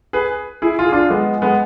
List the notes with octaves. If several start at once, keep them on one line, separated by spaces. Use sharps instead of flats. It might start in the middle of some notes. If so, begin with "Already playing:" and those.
G#4 B4
E4 G#4
F4
G#4
D4 F4
G#3 B3
G#3 B3